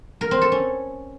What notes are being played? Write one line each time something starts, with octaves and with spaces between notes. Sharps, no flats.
A#4
C4
A4
C#4